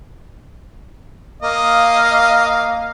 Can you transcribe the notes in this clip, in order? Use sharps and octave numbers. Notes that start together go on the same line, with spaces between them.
A#3 D#5 F5